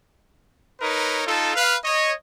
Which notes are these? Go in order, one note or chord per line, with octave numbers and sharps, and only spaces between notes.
D#4 A#4 B4 C#5
D#4 F4 A4
B4 F5
C#5 D#5